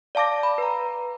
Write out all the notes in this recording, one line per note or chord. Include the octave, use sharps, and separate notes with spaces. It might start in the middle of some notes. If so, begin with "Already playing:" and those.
D5 F5 A5 D6 A#6
B5
B4 A#5